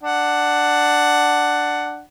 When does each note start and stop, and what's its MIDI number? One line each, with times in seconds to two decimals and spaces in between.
0.03 2.02 62
0.03 2.02 78